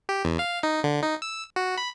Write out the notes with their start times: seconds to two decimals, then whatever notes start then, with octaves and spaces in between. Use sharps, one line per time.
0.09 G4
0.25 E2
0.39 F5
0.63 D#4
0.84 D3
1.02 D#4
1.22 E6
1.56 F#4
1.78 B5